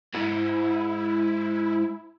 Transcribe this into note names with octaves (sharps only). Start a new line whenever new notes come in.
G#2 E4